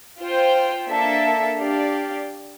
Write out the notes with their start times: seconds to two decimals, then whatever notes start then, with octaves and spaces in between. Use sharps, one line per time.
0.19 F4 C5 G5
0.89 A#3 D4 A4 E5
1.59 D4 G4 D5 F5